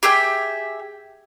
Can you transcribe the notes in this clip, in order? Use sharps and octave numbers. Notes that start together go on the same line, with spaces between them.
G4 G#4 E5 G5